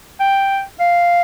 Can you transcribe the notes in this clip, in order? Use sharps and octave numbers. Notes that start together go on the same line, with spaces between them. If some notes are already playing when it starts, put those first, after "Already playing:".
G5
F5